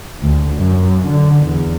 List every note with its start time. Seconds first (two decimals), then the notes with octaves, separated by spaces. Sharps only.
0.21 D2
0.56 F#2
1.07 D3
1.47 E2